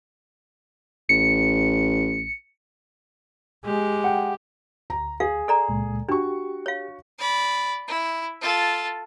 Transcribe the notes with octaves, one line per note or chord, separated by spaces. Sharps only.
A1 C#7
G#3 G4
F#5 G5
D2 A#5
G#4 F5
A4 D5 A#5
C#2 A#2 G#3
D4 F#4 G4 C#6
C#5 F5
D5 B5
E4
F4 A4